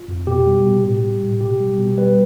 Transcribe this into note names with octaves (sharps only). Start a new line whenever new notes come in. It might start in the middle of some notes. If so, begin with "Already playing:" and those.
Already playing: F4
F2
B2 G4
G3
B2
A2 G4
G3
A2
B2 G4
G3
B2
G3 B4